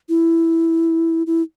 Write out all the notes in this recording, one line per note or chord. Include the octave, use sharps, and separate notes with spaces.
E4
E4